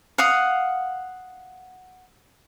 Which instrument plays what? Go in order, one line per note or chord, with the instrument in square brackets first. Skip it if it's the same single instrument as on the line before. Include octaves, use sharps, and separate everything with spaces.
[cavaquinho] F5 F#5 D#6